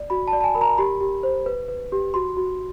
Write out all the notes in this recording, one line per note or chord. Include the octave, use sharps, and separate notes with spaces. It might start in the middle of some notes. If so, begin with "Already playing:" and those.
Already playing: D5
F#4 B5
A5
D5
A5
G#5
A#4 B5
A#5
G4 B5
G4
C5
B4
B4
G4
F#4 C6
F#4